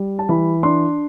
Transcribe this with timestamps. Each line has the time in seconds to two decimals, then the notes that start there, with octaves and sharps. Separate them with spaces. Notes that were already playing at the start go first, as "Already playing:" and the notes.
Already playing: G3
0.19 A5
0.29 E3 B5
0.63 D4 C6